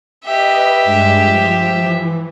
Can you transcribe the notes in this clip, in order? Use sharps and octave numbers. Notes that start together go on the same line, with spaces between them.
G4 B4 D#5 E5
G2 G#3
F3
E3